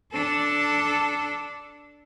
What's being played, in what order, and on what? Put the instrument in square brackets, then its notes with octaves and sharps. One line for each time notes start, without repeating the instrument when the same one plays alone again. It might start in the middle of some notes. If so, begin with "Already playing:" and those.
[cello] D4 A4